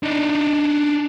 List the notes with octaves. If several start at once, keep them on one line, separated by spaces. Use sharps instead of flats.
D4 D#4